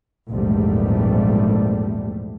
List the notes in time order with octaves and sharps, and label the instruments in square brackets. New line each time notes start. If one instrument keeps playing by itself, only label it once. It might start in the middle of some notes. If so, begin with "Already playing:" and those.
[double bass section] A#1 E2 G#2 C3 G3 A3